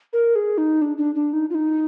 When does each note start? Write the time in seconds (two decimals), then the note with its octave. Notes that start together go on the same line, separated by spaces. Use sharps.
0.13 A#4
0.35 G#4
0.58 D#4
0.82 D4
0.97 D4
1.15 D4
1.33 D#4
1.50 F4
1.55 D#4